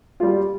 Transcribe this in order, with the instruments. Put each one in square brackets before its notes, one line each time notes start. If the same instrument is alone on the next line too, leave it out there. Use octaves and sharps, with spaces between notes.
[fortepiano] F4
G3
G4